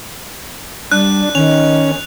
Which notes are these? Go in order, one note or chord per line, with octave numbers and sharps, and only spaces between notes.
G3 D4 F#6
D#3 C#4 F7